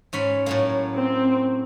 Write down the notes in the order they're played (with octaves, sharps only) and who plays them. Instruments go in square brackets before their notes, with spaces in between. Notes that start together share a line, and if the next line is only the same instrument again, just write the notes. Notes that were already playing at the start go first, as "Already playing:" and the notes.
[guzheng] G#2 C#4 B5
A2 F#3 A#3
[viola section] C4